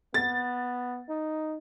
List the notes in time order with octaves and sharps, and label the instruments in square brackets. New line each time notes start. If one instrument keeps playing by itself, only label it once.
[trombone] B3 [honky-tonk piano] A6
[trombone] D#4